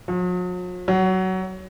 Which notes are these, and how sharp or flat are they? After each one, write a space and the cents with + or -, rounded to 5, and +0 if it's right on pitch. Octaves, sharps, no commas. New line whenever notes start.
F#3 -45
F#3 +20